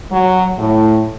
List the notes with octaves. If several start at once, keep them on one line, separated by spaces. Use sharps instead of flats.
F#3
A2